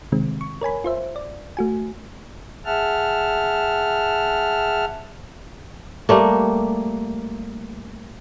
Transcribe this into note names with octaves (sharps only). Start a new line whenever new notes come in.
C3 D#3 G#3 C4
C#6
A#4 C#5 G#5 B5
F4 C5 E5
D5
A3 F#4 G#5
G#4 E5 F#5 A5 F6
G3 A3 A#3